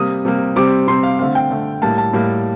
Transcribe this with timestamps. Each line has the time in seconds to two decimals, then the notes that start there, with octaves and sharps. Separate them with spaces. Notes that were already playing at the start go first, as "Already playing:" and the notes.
Already playing: C3 G3 A#3 D#6
0.25 C3 G3 A#3
0.56 C3 G3 C4 D6
0.88 C3 G3 C4 C6
1.03 F5
1.19 D3 A3 C4 F5
1.35 G5
1.50 D3 A3 C4
1.82 A2 G3 A#3 A5
1.98 A5
2.13 A2 G3 A#3